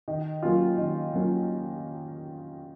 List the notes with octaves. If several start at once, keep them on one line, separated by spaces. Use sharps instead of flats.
D#3
F#3 A#3 C#4 F4
D#3
F#3 A#3 C#4 F4